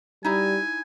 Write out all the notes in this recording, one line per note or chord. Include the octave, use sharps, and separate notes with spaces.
G3 D#4 E4 G#5